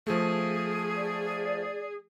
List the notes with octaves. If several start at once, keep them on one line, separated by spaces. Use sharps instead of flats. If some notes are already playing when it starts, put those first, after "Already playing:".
F3 A3 G#4
D5